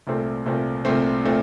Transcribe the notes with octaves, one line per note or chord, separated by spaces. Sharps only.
C2 A#2 A3 C4
C2 A#2 A3 C4
C2 A#2 A3 C4
A#2 A3 C4